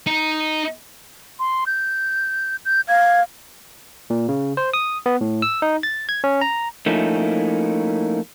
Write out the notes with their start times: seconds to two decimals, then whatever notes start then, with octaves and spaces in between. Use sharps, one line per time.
0.07 D#4
1.39 C6
1.67 G6
2.65 G6
2.89 F5 G#6
4.10 A#2
4.29 C#3
4.57 C5
4.74 D#6
5.06 B3
5.21 A2
5.42 E6
5.62 D#4
5.83 A6
6.09 G#6
6.24 C#4
6.41 A#5
6.86 F3 A3 A#3 C#4 D#4 E4